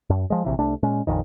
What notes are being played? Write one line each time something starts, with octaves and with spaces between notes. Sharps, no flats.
F#2
F3 G#3
A#1 C3 E3
C2 A3 D4
A#2 G#3 C#4
A#1 F2 D#3